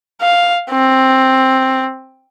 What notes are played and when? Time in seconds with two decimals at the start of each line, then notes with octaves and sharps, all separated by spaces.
0.21 F5
0.70 C4